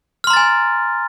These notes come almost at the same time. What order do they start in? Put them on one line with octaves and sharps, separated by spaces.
F6 C6 A#5 A6 G#5